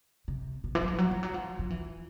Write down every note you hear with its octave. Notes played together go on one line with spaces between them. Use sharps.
C3
B2
E3
F#3
F3
F#3
F3
F#3
F3
F3
E3